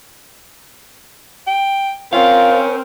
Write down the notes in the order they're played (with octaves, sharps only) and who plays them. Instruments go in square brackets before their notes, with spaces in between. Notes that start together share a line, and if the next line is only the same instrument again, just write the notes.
[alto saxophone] G5
[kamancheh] C4 A#4 [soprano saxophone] C#4 [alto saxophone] F4 [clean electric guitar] F5